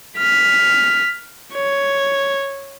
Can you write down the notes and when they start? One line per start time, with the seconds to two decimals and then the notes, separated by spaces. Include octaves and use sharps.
0.18 F6 B6
1.53 C#5